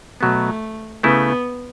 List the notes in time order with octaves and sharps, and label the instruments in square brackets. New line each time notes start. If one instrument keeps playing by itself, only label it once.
[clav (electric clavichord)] B2 F#3 B3 [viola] A3
[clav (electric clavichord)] C#3 A3 E4 [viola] B3